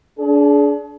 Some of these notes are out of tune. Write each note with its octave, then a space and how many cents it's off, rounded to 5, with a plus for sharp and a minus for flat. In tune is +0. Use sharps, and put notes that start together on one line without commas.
D4 -25 G#4 +30